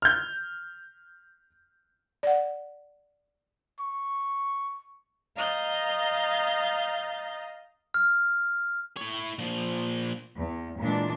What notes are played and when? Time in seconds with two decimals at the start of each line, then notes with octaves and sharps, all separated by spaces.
0.02 F6 G6
2.23 D5 F#5
3.80 C#6
5.37 D#5 F5 A#5 D#6 G6 A6
7.94 F6
8.97 E4 C#5
9.39 A#2 F3
10.37 E2
10.80 A#2 E3 G#3 D4